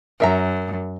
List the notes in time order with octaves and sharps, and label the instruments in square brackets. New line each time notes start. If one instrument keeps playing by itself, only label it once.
[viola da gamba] F#2 [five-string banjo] A#4 E5 A#5